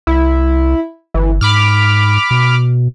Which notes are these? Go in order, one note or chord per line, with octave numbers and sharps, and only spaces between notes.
C2 E4
G1 E3
G#2 B5 D6 F6
B2